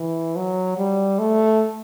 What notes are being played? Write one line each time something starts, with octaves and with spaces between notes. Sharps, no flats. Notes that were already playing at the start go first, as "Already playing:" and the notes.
Already playing: E3
F#3
G3
A3